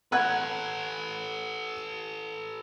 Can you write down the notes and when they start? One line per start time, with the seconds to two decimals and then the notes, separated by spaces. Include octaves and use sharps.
0.12 A4 B4 F#5 F#6 G#6